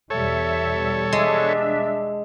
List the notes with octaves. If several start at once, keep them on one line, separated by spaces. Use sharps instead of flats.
E2 B2 G3 A4 C#5 E5
G#3 D4 E5